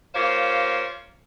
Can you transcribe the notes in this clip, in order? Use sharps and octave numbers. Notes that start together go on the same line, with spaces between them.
A#3 F4 G4 C5 C#5 F5